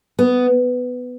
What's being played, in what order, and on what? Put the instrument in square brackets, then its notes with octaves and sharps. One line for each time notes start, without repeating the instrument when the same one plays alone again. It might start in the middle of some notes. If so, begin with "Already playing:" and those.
[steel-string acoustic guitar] B3